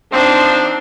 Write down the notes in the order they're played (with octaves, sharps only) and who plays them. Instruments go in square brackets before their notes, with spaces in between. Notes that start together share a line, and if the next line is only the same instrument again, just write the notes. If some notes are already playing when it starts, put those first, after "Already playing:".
[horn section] F3 C4 [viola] D4 D#4